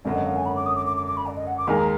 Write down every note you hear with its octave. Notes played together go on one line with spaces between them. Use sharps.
G#1 F#2 D3 F#3 D5
D#5
F5
G#5
B5
D6
D#6
D6
D6
D6
D6
B5
D5
D#5
F#5
D6
D#2 D#3 G#3 D#4 A#4 G#5
A#5